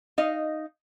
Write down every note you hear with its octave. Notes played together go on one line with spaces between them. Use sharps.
D#4 D#5 F5